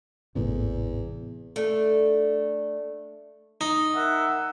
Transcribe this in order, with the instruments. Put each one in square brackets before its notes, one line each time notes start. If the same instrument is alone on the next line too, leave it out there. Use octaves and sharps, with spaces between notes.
[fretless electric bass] G#1 A2 C3 [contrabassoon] E2
[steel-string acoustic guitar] A3 D4
[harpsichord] D#4
[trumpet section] A#4 E5 F#5